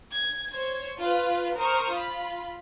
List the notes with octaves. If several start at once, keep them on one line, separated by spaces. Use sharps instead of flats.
G#6
C5 C#5 G#6
F4 B4
A#4 C5 C#6 D#6 F6
F4 B5